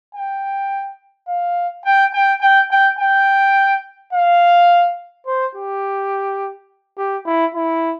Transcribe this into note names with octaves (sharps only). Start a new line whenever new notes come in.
G5
F5
G5
G5
G5
G5
G5
F5
C5
G4
G4
E4
E4